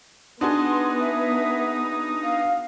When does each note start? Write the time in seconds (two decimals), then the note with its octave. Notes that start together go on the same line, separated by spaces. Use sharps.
0.41 B3 D4 D#4 F#4 G#4 B4 C6
1.00 E5
2.23 F5